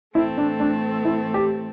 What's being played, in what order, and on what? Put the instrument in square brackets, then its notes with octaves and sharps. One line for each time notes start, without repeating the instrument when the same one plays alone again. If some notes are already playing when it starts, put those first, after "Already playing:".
[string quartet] A2 E3 A3 C4 A4 [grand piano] E4
[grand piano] D4
D4
E4
G4